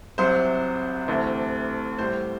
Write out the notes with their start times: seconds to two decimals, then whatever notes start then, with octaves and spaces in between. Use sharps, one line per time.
0.18 C2 C3 F#3 C5
1.08 D2 C3 E3 A3
1.99 A2 G3 C5